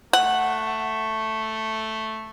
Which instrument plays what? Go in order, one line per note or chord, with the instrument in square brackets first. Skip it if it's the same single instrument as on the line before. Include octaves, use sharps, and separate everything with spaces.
[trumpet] A3 [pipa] F#5